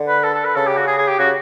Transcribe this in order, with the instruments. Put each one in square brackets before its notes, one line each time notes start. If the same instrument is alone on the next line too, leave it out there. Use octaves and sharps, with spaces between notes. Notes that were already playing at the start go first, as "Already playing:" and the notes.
Already playing: [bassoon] D3
[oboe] B4
A4
A4
B4
[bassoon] C#3 [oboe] A4
[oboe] G4
F#4
G#4
G#4
G4
[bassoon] C#3 [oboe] F#4